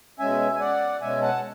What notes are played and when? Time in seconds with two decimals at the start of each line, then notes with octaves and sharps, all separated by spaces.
0.19 B2 G#3 C#4 E5 G#5
0.55 G#5
0.60 D5 F#5
1.01 B2 G#3 C#4 E5 G#5
1.22 F#5 A5